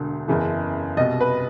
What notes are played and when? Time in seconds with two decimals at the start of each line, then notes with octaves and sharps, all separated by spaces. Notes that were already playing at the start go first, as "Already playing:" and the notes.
Already playing: E1 D2 D3
0.28 F#1 E2 C#3 E3
0.97 C2 B2 D#5
1.20 B4